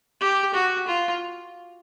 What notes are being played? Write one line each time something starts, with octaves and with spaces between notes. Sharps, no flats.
G4
F#4
F4